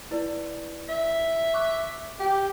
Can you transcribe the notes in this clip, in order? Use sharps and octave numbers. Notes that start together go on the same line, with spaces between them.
E4 B4 D5
E5
C#6 D6 F#6
G4